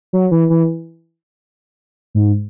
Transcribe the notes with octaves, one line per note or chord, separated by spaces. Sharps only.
F#3
E3
E3
G#2